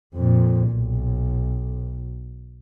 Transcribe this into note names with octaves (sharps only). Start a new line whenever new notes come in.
F2 A#2
B1